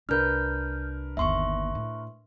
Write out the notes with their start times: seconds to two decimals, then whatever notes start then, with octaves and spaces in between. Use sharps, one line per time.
0.09 C2 D4 A#4 B4 F6 G6
1.17 G1 D#2 E5 C6 C#6
1.75 A2